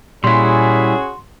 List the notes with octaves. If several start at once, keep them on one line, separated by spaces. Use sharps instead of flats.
A#2 G3 C#4 E4 F#4 G#4 C6